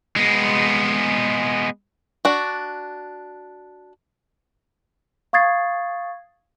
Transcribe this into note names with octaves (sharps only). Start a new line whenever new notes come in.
G#3 B3
D4 F#4
F5 C#6 D#6 G#6 A6 C7